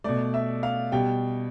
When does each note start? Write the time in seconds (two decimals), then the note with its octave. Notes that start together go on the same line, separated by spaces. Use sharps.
0.04 B2 A3 D5
0.34 E5
0.63 F5
0.92 B2 G3 G5